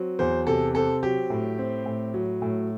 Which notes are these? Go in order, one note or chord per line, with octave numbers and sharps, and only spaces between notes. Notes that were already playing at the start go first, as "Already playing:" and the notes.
Already playing: F#3 C4
E2 C5
C3 A4
C4 A4
F#3 G4
A2
C4
A2
F#3
A2